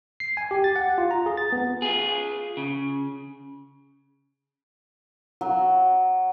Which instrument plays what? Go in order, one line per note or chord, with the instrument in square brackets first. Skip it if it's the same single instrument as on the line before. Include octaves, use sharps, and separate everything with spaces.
[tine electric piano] C7
G#5
G4
A6
F#5
F4
A#5
G#4
A6
B3
[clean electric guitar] F4 G#4
C#3
[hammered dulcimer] F#3